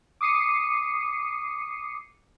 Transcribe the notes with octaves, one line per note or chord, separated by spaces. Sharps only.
D6 D#6 C7 C#7 D#7